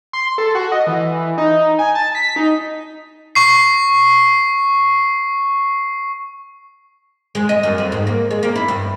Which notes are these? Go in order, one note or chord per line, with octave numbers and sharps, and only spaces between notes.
C6
A4
F#4
D#5
E3
D#4
G#5
A5
B6
D#4
C#6 C7
G#3
D#5
F#2
F2
G#2
A#3
G#3
A#3
E4
G2